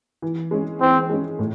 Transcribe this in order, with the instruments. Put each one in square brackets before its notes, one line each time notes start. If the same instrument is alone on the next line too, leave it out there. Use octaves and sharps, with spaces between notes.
[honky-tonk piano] E3
G#3 C#4
[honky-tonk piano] E3 [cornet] C4
[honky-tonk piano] G#3 C#4
A2